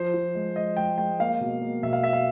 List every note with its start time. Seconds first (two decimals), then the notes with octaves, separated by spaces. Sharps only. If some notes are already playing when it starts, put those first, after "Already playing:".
Already playing: F3 C5
0.14 F3
0.35 G#3
0.56 G#3 D#5
0.77 G#3 G5
0.98 G#3 G5
1.20 A#3 F5
1.41 B2
1.62 A#3
1.83 B1 E5
1.93 F5
2.03 A#3 E5
2.13 F5